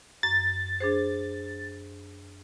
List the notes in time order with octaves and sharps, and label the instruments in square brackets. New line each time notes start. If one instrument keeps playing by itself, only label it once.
[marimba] F#2 [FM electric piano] A6
[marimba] D4 G#4 C5